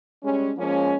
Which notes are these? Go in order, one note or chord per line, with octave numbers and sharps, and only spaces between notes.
G3 G#3 C#4
F3 G#3 A#3 C#4